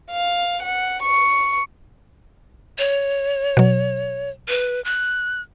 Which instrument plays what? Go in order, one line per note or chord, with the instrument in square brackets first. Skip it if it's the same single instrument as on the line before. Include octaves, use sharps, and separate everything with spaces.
[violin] F5
F#5
C#6
[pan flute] C#5
[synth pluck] B2 F#3
[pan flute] B4
F#6